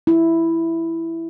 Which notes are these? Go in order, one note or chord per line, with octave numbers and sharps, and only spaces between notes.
E4